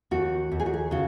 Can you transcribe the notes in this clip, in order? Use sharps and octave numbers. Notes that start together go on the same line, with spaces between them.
D#2 F#4
D#2
G#4
F#4
G#4
C#3 F#4